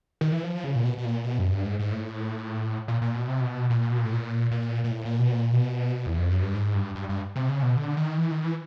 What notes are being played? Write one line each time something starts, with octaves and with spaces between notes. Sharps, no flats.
D#3
E3
F3
C#3
A#2
B2
B2
A#2
B2
F#2
G2
G#2
G#2
A2
A#2
A#2
B2
C3
B2
A#2
B2
A#2
A2
A#2
A#2
A#2
A2
A#2
B2
A#2
B2
E2
F2
F#2
G2
G#2
G2
G2
G2
C3
C#3
B2
D3
D#3
E3
D#3
E3